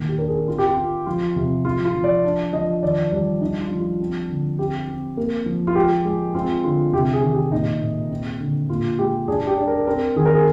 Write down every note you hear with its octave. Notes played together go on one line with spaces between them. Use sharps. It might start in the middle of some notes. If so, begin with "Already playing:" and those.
Already playing: A#2 D#3
G4
D4 A#4
G#4
C4 F4
G4
F4
C4
F3 F4
C3
F3 F4
F4
F3
D5
D4
F3 D#5
D#3 D5
G3 D5
D4 D#4
F4
F3
F4
C4
D3
C4 G4
C4
A#3
F3
F4
G#3 G4
G#3
C4 F4
D3 F4
C3 G4
G#4
D#3
G4
A#2 D#4
A#2
C4
D3
A#2 F4
G#3 G4
D4 G#4
G4
D4
A#4
C4 A#4
D#3 G#4
A#4
G#4